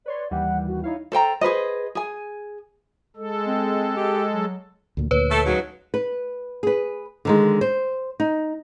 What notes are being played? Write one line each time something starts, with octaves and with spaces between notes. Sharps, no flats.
B4 C#5 D5 C6
D#2 E3 G3 F#5
F#4
D#4 E4 C#5 F5
A4 C5 G5 A#5
G#4 B4 C5 D#5
G#4 G#5
G#3 A4
C4
G4
F#3
D2 A#2
D2 A#2 B4 C#5
A3 A4
G#2 C#3 F#3
B4
G#4 B4
D3 D#3 G#3
C5
D#4